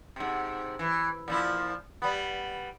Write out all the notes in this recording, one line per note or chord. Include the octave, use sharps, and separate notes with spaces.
G#2 C3
E3
A#2 F3 E4
G3 B3